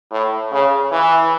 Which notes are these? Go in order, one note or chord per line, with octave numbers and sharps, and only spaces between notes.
A2
C#3
E3